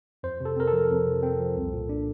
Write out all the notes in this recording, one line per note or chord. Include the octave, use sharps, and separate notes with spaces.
F2 C5
C3 A4
C4 A#4
A4
F3
F2
C3
C4
F3
C2
A#2
D4